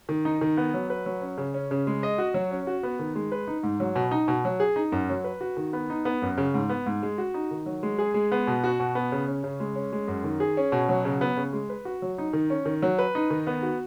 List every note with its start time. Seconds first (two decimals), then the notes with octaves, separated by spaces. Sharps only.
0.09 D#3
0.25 D#4
0.41 D#3
0.57 B3
0.74 F#3
0.90 B4
1.06 F#3
1.21 C#4
1.37 C#3
1.54 C#4
1.71 C#3
1.87 G#3
2.03 D#5
2.18 F#4
2.34 F#3
2.51 C#4
2.67 F#4
2.83 B3
2.99 D#3
3.15 G#3
3.32 B4
3.48 D#4
3.63 G#2
3.80 F#3
3.96 B2
4.11 D#4
4.28 B2
4.45 F#3
4.60 G#4
4.76 D#4
4.92 F#2
5.09 F#3
5.24 B4
5.41 F#4
5.57 D#3
5.73 B3
5.90 D#4
6.05 B3
6.22 F#2
6.38 C#3
6.54 G#2
6.70 B3
6.86 G#2
7.03 G#3
7.18 F#4
7.34 D#4
7.51 D#3
7.66 F#3
7.83 G#3
7.99 G#4
8.14 G#3
8.32 B3
8.47 B2
8.64 F#4
8.80 B2
8.95 B3
9.12 C#3
9.28 C#4
9.44 C#3
9.60 G#3
9.75 C#4
9.92 G#3
10.08 F#2
10.24 D#3
10.40 G#4
10.57 C#4
10.72 B2
10.89 F#3
11.05 C#3
11.21 B3
11.37 C#3
11.53 G#3
11.70 B4
11.85 F#4
12.02 F#3
12.18 D#4
12.33 D#3
12.50 C#4
12.66 D#3
12.82 F#3
12.99 B4
13.15 D#4
13.30 D#3
13.47 B3
13.63 F#4